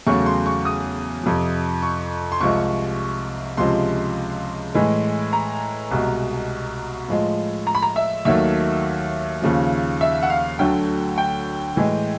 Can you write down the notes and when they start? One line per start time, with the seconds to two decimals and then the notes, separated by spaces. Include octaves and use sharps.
0.07 E2 C#3 F#3 A3 C#6
0.26 C6
0.46 C#6
0.65 D#6
1.23 F2 C3 F3
1.82 C#6
2.32 C6
2.40 C2 C3 F3 G#3 C#6
3.57 C#2 C3 F3 G#3 C6
4.75 A2 E3 G#3
5.33 A#5
5.91 C2 B2 G#3
7.08 A2 F3 G#3
7.67 A#5
7.75 B5
7.82 A#5
7.96 E5
8.25 D#2 D#3 F#3 A3 E5
9.42 D#2 C#3 F3
10.01 E5
10.23 F#5
10.30 F5
10.59 D2 D3 F#3 A3 G5
11.18 G5
11.76 A2 E3 G#3